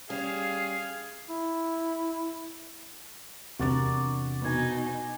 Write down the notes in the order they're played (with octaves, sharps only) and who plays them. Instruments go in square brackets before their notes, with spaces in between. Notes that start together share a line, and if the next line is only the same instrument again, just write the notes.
[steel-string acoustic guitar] G3 C#4 [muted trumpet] G#4 [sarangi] F5
[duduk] E4
[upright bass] E2 D4 [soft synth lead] C3 [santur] F#4 A#4 D5
[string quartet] B2 D#4 [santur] B4 G#5